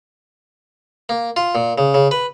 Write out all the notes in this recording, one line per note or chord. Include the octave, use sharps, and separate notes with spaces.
A#3
F4
A#2
C#3
C#3
B4